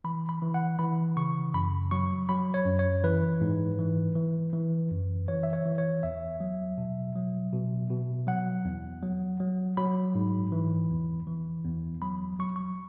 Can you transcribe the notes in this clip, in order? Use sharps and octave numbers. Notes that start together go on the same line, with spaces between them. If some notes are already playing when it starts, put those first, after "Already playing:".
E3 B5
B5
E3
F#5
E3 B5
C#3 C#6
F#2 B5
F#3 C#6
F#3 B5
C#5
F#2
C#5
E3 B4
G#2
E3
E3
E3
F#2
E3 C#5
E5
C#5
E3
C#5
E2 E5
F#3
B2
F#3
B2
B2
F#3 F#5
E2
F#3
F#3
F#3 B5
G#2
E3
E2
E3
E2
F#3 B5
F#3 C#6
C#6